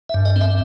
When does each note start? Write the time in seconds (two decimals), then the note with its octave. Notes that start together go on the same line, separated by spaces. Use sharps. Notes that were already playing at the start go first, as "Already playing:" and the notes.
0.09 E5
0.14 G2
0.25 D#5
0.36 C4 E5